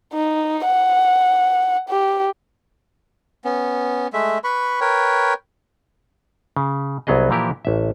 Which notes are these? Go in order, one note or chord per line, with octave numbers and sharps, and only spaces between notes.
D#4
F#5
G4
B3 C#4
G#3 A3 E5
B4 B5 C#6
A#4 B4 C#5 G5
C#3
C2 F#3 B3 G#4 D#5
A#2 E3 F3 E4 G4 A#4
A1 E5